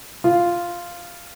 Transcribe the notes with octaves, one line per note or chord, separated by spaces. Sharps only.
F4